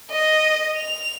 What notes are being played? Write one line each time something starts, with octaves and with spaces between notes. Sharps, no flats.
D#5
F7